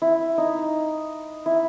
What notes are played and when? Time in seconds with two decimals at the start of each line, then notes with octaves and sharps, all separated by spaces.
0.02 E4
0.38 D#4
1.46 E4